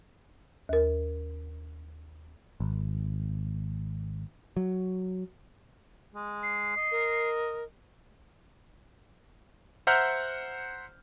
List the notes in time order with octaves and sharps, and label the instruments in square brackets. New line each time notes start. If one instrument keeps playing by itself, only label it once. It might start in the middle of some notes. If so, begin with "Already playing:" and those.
[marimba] D#2 A#4
[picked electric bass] G#1
F#3
[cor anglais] G#3
[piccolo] C7
[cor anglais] D#5
[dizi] A#4
[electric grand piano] C5 E5 F#5 A#5 F6 G6